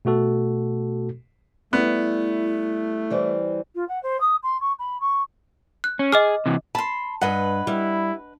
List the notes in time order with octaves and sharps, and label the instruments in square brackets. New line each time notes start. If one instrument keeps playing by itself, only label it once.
[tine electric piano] B2 A3 F#4 A4
[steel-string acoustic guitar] G3 [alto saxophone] A3 [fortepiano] B3 [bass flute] E4
[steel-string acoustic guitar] E3 G3 C4
[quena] F4
F#5
C5
D#6
C6
C#6
B5
C#6
[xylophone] F#6
[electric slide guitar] C#4
[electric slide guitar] G#4 [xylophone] D#5 D6 F6
[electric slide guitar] C3 E3
[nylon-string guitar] A5 [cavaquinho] B5 C6
[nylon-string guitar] G2 [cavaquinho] B4 D#5 F#5
[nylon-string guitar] G3 [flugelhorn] E4